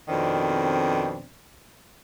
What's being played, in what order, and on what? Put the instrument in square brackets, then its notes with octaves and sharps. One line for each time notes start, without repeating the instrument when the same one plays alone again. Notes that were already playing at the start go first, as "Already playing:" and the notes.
[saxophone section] F2 B2 D#3 C4 D4